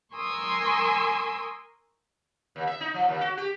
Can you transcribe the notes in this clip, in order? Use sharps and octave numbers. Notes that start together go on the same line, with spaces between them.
A#4 G#5 C6 C#6 D#6 E6
D#2
E5
D#4
F3
D#2
F#4
G4